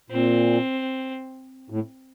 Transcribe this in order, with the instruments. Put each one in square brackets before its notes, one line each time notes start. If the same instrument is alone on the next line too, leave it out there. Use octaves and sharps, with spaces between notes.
[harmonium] A#2 [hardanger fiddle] C4
[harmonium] A2